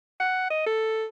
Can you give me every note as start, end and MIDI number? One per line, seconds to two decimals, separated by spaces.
0.20 0.47 78
0.50 0.63 75
0.66 1.05 69